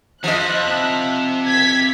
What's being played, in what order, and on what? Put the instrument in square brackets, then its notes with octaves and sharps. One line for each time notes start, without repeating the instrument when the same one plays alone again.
[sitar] F3 D#5 [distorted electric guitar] E4 G#4 [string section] F#6
[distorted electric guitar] C3 E5
[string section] G#6 B6